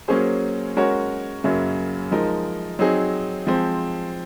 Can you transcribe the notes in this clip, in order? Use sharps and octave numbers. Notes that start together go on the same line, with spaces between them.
F#3 A#3 C#4 G#4 C5
G#3 C#4 F#4 A#4 C#5
F#2 C#3 F#3 A#3
F3 G#3 D#4 A#4
F#3 C4 D#4 G#4
F3 G#3 C4